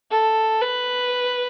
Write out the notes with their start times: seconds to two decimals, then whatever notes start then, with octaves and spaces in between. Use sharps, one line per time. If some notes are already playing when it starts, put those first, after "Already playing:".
0.11 A4
0.62 B4